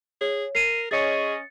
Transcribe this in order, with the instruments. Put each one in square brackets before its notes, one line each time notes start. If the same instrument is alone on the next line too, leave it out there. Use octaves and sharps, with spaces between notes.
[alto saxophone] G#4 [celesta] C#5
[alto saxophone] A#4 [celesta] C7 D#7
[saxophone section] C#4 D#5 [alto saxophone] G#4 [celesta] A6 C#7